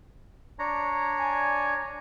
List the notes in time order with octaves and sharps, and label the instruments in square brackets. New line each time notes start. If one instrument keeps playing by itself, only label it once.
[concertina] D4 C#5 A#5
[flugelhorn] G#5